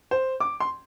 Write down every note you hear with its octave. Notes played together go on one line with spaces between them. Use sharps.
C5
D6
C6